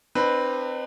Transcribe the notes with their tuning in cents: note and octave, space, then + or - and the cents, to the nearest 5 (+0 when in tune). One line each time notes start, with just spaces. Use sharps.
C4 +0 D#4 -45 B4 +0